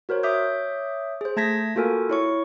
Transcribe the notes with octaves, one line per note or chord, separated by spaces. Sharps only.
F#4 A#4 C5 C#5
C#5 E5 D6 D#6 G6
G#4 C5
A3 A5 G#6 A#6 B6
A#3 F4 F#4 A4 A#4 G#5
E4 C#5 C#6